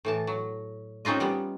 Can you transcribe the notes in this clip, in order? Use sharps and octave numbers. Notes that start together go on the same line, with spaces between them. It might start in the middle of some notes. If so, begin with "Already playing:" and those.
A2 E3 A5
F#3
C4 C#4 D#4 F4 D#5
G3 B3